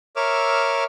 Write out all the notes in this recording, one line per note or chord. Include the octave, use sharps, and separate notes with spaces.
A#4 C#5 E5 D6 E6 F6